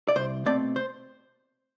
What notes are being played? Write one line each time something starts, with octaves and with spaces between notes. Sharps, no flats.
D5
C2 C5
B2 A3 C4 D5
C5